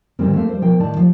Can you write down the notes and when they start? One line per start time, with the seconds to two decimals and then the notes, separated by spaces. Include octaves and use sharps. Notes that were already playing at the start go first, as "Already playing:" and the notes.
0.19 D2 G#2 D#3 G3 C4
0.33 A3 A#3 C4 F5
0.49 G3 C5
0.61 B2 F3 A#4 G5
0.79 A2 D#3 D5 A5
0.97 C3 F3